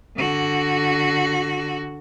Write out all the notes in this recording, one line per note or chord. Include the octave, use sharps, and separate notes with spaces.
D3 F#4